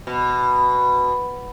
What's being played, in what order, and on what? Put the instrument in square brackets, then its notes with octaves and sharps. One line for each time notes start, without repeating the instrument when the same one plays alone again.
[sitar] B2